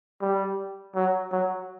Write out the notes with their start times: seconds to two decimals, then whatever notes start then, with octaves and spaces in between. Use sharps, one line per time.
0.21 G3
0.95 F#3
1.32 F#3